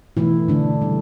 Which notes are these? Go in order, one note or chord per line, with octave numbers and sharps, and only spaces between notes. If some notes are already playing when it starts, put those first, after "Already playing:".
B2 E3 A3 E4
B2 D3 A3 D4
C#3 G3